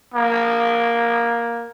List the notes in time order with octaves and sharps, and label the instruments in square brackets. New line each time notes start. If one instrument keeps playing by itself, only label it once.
[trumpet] A#3